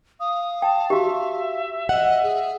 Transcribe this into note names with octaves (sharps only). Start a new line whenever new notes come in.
F5 D#6
G5 A5
F#4 G4 E5
D#5 F#5
G#4